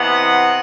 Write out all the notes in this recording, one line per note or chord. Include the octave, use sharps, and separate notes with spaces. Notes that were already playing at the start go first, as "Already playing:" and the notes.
Already playing: C3 E3 B3 D#5 F#5